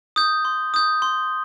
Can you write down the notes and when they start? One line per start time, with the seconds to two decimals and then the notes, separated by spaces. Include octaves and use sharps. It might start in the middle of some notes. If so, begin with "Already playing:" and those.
0.16 D#6 G6
0.45 C6
0.74 D#6 G6
1.02 C6